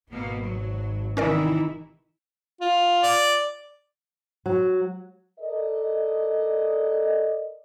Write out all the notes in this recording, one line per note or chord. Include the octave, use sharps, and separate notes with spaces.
G#1 B2 A#3 B3
F#3
C3 D#3 E3 C#4 D#4 E4 A#4 D5
F4
D5
F#3
A4 A#4 D5 D#5